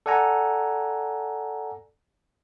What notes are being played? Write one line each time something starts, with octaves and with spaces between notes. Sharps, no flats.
A4 D5 F#5 G#5 A#5